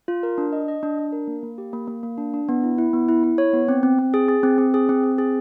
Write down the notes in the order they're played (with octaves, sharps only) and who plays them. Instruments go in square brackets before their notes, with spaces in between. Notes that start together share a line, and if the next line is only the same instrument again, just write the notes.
[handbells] F4
A#4
D4
D#5
D#5
D4
D4
A#4
A#3
A#3
G4
A#3
A#3
A#3
D4
D4
B3
E4
E4
B3
E4
E4
C#5
B3
C4
C4
C4
G#4
G#4
C4
C4
G#4
C4
C4
G#4